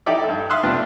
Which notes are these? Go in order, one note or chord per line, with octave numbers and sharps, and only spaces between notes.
D#4 E4 G4 A4 D5 E5
G2 A4
E5 F5 C6 D#6 E6 F#6
C3 G3 A3 B3 D4 F4